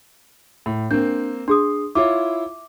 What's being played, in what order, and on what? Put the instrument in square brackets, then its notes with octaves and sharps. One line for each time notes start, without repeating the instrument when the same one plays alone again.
[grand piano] A2
[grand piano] A#3 C4 [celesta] D4 G6
[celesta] D4 G#4 D#6 [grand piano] C6
[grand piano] E4 F4 C#5 [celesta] E5 D6